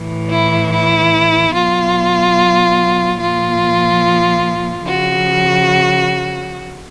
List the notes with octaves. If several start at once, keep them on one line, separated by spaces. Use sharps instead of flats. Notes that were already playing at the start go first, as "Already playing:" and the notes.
Already playing: A2 E3
E4
E4
B2 F#3 F4
A#2 F3 F4
C#3 F3 F#4